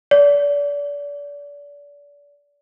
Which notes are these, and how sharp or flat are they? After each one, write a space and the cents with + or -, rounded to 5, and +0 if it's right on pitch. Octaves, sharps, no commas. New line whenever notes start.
D5 -35